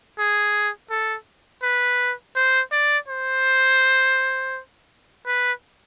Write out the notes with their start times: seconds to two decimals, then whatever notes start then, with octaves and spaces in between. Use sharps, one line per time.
0.19 G#4
0.90 A4
1.63 B4
2.36 C5
2.72 D5
3.08 C5
5.27 B4